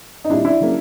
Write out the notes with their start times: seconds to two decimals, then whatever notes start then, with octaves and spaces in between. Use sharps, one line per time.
0.25 D#4
0.30 A#2 G3 C4 D4 E4
0.45 D4 E4
0.60 C#3 F#3 A#3